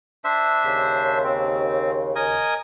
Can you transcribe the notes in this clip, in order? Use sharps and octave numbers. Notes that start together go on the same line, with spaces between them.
D4 C5 E5
D#2 C#3
C4
A#4 D#5 G#5